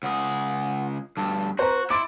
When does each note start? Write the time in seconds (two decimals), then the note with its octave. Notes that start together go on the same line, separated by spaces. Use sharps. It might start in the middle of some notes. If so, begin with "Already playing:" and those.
0.03 C#2 G#4 F#5
1.17 D2 G2 A5
1.59 F#4 B4 C5 A#5
1.90 E4 C6 D6 A6 D7